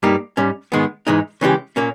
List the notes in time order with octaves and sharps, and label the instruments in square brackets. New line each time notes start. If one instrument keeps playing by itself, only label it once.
[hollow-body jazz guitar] G2 G3 A#3 D#4 G4
G#2 G3 C#4
G#2 D#3 G#3 B3
G#2 E3 G#3 D#4
C#3 E3 G#3 C#4 G4
A#2 A#3 C#4